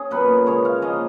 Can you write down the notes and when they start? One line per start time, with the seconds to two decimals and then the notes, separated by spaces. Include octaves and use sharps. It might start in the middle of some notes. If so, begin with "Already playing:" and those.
Already playing: C#4 G#4
0.11 A#2 F#3 B3 B4
0.46 C#3 G#3 B3 C#5
0.65 F5
0.82 F3 A#3 C#4 D#5